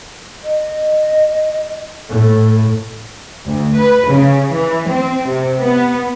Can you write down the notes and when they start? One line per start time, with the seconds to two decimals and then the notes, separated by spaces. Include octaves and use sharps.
0.44 D#5
2.09 A2 A4
3.46 D2
3.76 B4
4.08 C#3
4.52 E3
4.88 C4
5.28 C3
5.61 B3